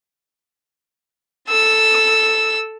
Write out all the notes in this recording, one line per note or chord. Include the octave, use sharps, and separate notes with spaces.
A4 E6